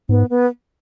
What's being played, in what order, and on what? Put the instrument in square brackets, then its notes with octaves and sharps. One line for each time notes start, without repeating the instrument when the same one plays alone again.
[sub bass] G#2 [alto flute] B3
[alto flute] B3